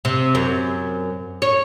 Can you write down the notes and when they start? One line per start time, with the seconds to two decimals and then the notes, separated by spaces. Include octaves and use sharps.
0.05 C3
0.35 F#2
1.42 C#5